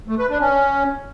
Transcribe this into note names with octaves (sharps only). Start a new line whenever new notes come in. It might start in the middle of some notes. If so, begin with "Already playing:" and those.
A3
B4
D4
C#4